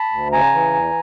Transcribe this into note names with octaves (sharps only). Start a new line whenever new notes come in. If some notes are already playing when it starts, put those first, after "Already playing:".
Already playing: A5 B5
D2
C#3 G#5 A#5
E3
E2